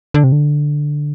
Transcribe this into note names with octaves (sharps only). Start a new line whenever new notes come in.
D3
C3
D3